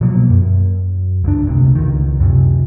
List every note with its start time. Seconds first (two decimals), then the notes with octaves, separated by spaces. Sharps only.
0.01 B2 F3 F#3 A#3
0.30 F#2
1.24 C#2 D4
1.46 E1 D2 C3
1.75 C#2 D#3
2.20 F#2 C3